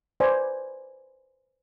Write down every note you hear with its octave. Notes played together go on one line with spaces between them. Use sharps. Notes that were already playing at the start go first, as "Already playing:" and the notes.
B4 C5 D5 G#5